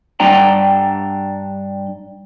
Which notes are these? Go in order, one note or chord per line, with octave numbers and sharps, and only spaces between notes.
G2 D4 G5 A#5